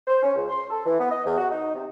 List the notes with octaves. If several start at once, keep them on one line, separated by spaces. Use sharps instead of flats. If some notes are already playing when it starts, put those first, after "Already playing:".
C5
C#4
C#2
C6
A4
E3
B3
D#5
E2
F#4
D#4
C3